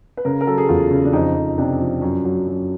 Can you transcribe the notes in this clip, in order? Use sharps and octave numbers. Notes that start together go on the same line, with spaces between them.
B4
C#3 A#4
A#4
F#3 A4
G#4
E2 F4
C#3
D4
F2 D#4
F2
C3 D4
F3
F#2
F#3
F#2